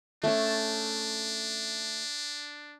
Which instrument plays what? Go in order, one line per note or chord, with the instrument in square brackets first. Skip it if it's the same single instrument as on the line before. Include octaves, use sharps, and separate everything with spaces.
[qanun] A3 C#4 A5 [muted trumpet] D4